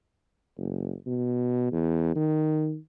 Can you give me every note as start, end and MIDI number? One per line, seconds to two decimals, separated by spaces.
0.58 0.92 30
1.06 1.71 47
1.72 2.15 40
2.15 2.77 51